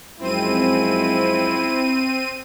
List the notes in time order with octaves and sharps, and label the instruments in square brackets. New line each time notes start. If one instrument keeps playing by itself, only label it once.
[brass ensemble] F#2 F3 G#3 [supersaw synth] C4 D#7 [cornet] E4